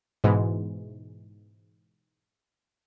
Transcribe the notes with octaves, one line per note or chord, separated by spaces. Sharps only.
G#2 B2 E3 G#3